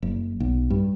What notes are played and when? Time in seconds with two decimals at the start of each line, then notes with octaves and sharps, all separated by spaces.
0.02 F#1
0.40 B1
0.70 G2